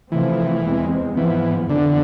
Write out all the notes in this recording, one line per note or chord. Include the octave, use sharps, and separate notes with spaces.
C3 E3 F3 A3 C4
E2 C3 G#3 C4
G#2 E3 F3 B3
F2 D3 E3 B3